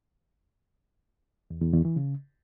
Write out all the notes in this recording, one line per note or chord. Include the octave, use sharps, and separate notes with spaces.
E2
E2
E2
E3
C#3